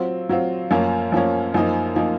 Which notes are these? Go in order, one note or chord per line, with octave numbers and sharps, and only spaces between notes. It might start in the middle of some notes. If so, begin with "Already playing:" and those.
Already playing: F#3 C4 F4
F#3 C4 F4
F#2 F3 A#3 C#4
F#2 F3 A#3 C#4
F#2 F3 A#3 D#4
F3 A#3 D#4